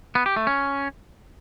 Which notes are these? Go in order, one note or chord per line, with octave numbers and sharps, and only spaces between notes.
B3
G4
A3
C#4